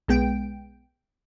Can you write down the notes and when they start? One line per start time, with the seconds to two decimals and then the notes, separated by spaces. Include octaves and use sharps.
0.08 B1 G#3 B3 G5 D7